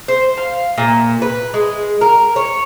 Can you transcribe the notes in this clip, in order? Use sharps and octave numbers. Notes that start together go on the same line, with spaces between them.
C5
F5
A#2
B4
G#3
A#4
C#5